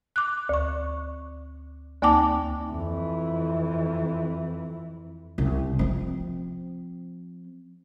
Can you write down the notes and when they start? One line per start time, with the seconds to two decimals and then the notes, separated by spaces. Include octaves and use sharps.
0.16 D6 F#6
0.49 D2 C#6
2.02 D2 A#3 D#4 G5 A5 D6
2.70 F2 E3
5.38 C2
5.79 F3 C4